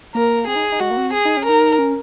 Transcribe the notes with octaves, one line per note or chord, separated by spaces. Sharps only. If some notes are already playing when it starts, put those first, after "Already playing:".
A#3 A#4
C4 G#4
D#4
D#4
G#3 F#4
A#3
C4
G#4
D#4
C#4
D#4 A#4
C#4